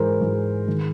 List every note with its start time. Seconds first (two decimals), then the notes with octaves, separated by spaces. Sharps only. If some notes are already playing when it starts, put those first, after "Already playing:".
Already playing: G#2 E3 G#3 A#4 C5
0.21 G#2 E3 G#3
0.67 D#3 G#3